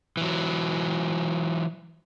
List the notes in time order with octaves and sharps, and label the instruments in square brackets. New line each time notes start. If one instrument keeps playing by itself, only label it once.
[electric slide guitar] E3 F#3